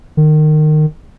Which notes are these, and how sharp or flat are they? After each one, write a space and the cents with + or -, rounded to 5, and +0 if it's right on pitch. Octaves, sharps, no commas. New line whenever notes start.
D#3 -25